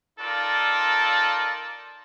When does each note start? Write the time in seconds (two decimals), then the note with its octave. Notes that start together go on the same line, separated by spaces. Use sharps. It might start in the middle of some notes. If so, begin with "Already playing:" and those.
0.19 D#4 F4 A4 A#4 D5